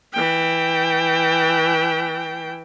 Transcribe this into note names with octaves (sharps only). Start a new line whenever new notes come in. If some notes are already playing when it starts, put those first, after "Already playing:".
E3 G5